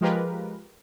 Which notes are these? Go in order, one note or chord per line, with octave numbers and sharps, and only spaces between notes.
F3 G#3 F4 G4 A#4 B4